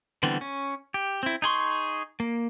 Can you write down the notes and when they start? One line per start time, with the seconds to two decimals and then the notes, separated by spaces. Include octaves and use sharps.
0.23 D3 E3 G3 B3 C4
0.41 C#4
0.94 G4
1.23 C4 E4
1.42 D#4 G#4 C6 C#6
2.20 A#3